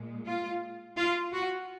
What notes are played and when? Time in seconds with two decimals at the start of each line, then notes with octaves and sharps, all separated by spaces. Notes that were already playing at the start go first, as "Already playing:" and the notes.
Already playing: A#2 G#3
0.25 F4
0.97 F4
1.33 F#4